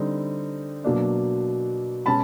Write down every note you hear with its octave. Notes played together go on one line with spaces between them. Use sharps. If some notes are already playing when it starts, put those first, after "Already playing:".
Already playing: D3 G3 C4 D#4
B2 F#3 A#3 D4
B2 G#3 C#4 A5 B5